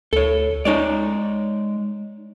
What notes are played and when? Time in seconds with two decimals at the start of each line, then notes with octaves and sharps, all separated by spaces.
0.13 D2 A4 C#5
0.65 G#3 D#4 C#5 D5